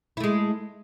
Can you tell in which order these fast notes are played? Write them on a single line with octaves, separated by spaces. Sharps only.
E4 A3 G#3